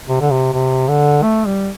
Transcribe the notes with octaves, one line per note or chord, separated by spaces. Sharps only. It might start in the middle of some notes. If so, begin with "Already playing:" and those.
C3
D3
C3
C3
D3
A3
G3